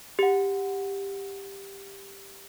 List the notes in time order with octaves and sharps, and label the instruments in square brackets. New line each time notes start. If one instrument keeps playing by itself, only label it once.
[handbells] G4 F#5